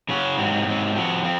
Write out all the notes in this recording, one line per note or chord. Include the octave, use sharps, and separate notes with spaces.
C#3 F#3 C#4 F#4
G#2 F#3 C4
G#2 F#3 C4
F3 C4 F#4
F3 C4